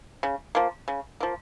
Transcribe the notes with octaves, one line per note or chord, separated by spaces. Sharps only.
C#3
F3 A#3
C#3
F3 A#3